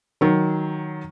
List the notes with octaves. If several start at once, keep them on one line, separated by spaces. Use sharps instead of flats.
D#3 F#3